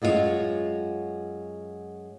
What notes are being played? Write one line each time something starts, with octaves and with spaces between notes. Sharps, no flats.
F#2 G#3 F4 F#4 C#5